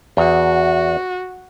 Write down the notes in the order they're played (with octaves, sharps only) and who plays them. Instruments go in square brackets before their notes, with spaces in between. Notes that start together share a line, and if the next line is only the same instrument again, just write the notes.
[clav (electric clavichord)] E2 [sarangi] F#4